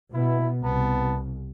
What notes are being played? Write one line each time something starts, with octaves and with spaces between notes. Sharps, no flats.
B2 B3 E4
C2 B3 A5